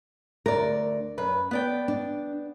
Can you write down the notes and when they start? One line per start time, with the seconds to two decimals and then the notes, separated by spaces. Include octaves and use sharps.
0.46 D2 A#4 D5
1.18 F#2 B4
1.51 B3 D5 G5
1.88 D4